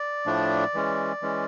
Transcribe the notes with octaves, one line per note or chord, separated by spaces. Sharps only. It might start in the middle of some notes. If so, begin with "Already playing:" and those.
Already playing: D5
A2 F3 A3 D4
E3 G#3 C#4
E3 G#3 C#4